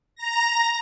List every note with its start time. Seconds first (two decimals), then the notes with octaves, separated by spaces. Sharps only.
0.16 A#5 A#6